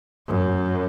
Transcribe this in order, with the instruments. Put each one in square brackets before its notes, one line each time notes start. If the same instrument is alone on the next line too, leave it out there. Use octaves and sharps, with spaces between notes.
[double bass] F#2